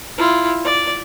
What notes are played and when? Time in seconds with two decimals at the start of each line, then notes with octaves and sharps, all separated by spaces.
0.17 E4 F4
0.65 D5